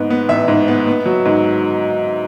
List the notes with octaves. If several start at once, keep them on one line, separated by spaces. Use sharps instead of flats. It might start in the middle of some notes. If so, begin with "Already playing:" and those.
Already playing: G#2 B3
B3
A1 E5
G#2
B3
B3
F#3
G#2